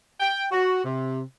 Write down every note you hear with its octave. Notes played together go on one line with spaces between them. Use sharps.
G5
F#4
C3